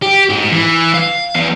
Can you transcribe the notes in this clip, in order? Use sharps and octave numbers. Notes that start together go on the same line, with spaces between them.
G4
G#2
E3
F5
E2